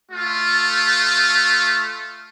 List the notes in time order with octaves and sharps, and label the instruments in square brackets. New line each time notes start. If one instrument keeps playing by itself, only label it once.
[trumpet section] A3 F4